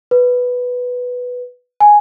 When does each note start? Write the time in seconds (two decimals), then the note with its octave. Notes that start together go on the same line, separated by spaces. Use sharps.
0.11 B4
1.80 G#5